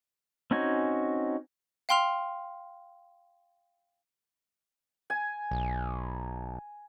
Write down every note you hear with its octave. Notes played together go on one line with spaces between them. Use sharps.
C4 C#4 D#4 F#4 G#5
F5 G5 C6 F6 F7
G#5
B1